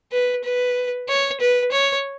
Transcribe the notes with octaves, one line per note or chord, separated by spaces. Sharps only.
B4
B4
C#5
B4
C#5